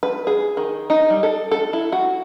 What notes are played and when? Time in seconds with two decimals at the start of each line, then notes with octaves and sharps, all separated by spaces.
0.03 B4
0.27 G#4
0.57 D#3
0.90 D#4
1.10 G3
1.23 A4
1.51 A4
1.73 E4
1.92 F#4